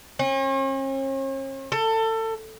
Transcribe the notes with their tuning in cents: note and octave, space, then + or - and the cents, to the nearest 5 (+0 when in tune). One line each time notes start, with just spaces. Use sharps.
C#4 -45
A4 +25